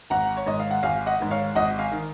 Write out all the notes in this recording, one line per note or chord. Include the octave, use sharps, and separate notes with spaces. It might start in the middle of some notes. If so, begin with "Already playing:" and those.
G#1 F#5 A#5
C#5
G#2 D#3 D#5
F5
F#5
G#1 F5 G#5
D#5 F#5
G#2 D#3
C#5 F5
G#1 D#5 F#5
F5 G#5
D#3